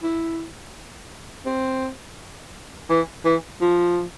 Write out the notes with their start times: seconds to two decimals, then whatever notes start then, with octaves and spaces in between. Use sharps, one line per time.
0.03 E4
1.46 C4
2.90 E3
3.25 E3
3.61 F3